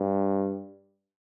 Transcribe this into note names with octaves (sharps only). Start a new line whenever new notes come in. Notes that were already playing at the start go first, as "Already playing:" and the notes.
Already playing: G2